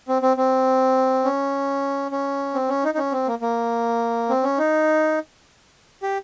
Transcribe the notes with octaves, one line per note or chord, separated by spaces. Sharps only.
C4
C4
C4
C#4
C#4
C4
C#4
D#4
D#4
C#4
C4
A#3
A#3
C4
C#4
D#4
G4